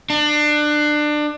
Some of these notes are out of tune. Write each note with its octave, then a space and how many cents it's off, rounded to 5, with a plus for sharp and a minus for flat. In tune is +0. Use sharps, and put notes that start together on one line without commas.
D4 +25